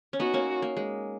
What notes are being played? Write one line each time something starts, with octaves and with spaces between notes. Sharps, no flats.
C#4
B3 D#4 F#4
A#3 C#4
A#3
G#3